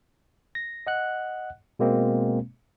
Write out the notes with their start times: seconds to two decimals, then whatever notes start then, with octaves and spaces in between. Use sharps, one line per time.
0.55 A#6
0.87 D#5 F#5 F#6
1.79 B2 G#3 A#3 C4